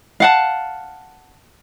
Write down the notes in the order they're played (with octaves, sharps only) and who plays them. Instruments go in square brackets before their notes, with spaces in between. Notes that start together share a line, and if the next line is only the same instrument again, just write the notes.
[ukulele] F5 F#5 A5